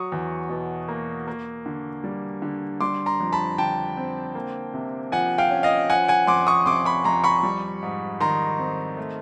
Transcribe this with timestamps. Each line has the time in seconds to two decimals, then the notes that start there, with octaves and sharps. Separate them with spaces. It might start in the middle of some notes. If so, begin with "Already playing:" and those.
Already playing: F#3 C#6 D#6
0.12 E2
0.49 B2
0.89 A#3
1.28 A#3
1.66 D3
2.04 G3
2.42 D3
2.81 G3 C6 D6
3.06 A#5 C6
3.20 F2
3.32 A5 B5
3.58 D3 G5 A5
3.97 C4
4.35 A#3
4.74 C3
5.12 F3 F#5 G#5
5.38 F5 G5
5.51 C#4
5.63 D#5 F5
5.90 F3 F#5 G#5
6.08 F#5 G#5
6.27 F2 C6 D6
6.47 C#6 D#6
6.66 C3 C6 D6
6.85 B5 C#6
7.04 F2 A#5 C6
7.24 B5 C#6
7.43 G3
7.83 G#2
8.20 D#3 A#5 C6
8.59 C4
8.97 A3